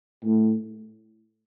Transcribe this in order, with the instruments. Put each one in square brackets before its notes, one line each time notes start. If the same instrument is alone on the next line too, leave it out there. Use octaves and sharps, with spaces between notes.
[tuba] A2